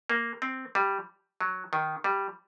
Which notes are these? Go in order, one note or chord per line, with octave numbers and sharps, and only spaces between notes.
A#3
C4
G3
F#3
D#3
G3